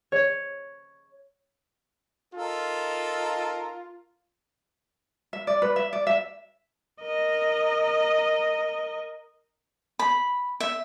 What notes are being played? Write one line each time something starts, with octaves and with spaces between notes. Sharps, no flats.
C#5
D#4 F4 A4 A#4
E5
D5
B4
E5
D5
E5
A#4 D#5
B5
E5